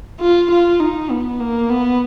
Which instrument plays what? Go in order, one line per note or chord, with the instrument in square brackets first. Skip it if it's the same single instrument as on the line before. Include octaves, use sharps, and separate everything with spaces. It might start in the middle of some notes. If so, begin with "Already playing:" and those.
[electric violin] F4
F4
D#4
B3
A#3
B3